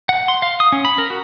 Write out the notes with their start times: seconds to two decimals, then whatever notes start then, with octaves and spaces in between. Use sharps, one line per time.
0.09 F#5
0.28 C6
0.42 F5
0.60 D#6
0.72 C#4
0.85 B5
0.98 A#4
1.10 F#4